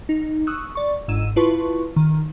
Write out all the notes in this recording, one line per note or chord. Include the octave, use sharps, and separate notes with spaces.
D#4
C#6 D#6 E6 F#6
D5 C#6
G1 G#2 E6 D#7 E7
E4 F4 B4 A5 C6 C#6
D#3